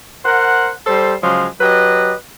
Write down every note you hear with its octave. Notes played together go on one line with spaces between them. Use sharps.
A#4 C5 F#5
G3 A4 C5
C#3 F3 F#3 G#3
F#3 G4 B4 D#5